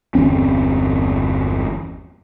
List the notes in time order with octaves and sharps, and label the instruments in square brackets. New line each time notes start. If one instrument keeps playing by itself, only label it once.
[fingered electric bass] G1 E2 C4 C#4